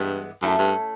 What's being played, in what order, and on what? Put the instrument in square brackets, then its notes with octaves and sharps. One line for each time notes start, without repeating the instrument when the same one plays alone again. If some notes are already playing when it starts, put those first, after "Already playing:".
Already playing: [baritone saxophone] G2 [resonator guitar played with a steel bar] E3 G#3 B3
[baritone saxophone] F#2 [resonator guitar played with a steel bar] A3 C#4 E4 A4
[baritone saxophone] G2